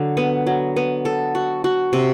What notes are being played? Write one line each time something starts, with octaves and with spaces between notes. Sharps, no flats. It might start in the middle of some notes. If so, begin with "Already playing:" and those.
Already playing: D3 F#3
B3
F#3
B3
A4
F#4
F#4
C3